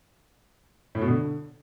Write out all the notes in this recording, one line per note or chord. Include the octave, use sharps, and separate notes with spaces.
A2
B2
D3